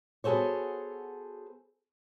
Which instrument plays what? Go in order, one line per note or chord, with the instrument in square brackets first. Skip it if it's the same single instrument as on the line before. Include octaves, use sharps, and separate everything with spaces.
[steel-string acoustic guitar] B3 F#4 G#4 A4 C5 C#5